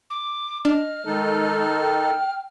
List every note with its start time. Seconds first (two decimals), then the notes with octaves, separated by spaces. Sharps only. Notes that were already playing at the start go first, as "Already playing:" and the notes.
0.10 D6
0.65 D4 D#5 F6
1.06 D#3 G#3 D#4 A4
1.81 G5